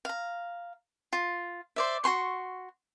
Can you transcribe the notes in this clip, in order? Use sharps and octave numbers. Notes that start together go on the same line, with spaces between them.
F5 A#5
F4
C5 D5 E5
F#4 G#4 C6 C#6